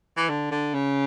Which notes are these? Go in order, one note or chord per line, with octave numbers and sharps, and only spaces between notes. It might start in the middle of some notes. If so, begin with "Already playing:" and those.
E3
D3
D3
C#3